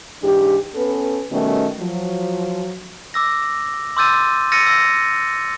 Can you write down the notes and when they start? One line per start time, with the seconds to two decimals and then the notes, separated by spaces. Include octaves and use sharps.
0.23 G#2 E3 D4 G4
0.75 B3 C#4 A4 B4
1.32 B2 D#3 G3 A3 B3 C#4
1.80 F3 F#3
3.14 D6 E6 A#6
3.97 C6 D6 E6 G6 A6 D#7
4.52 E6 F6 A6 A#6 C#7 D#7
4.66 E6 A#6